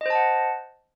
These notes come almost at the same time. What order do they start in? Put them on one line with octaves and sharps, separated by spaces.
D#5 C5 A5 F#5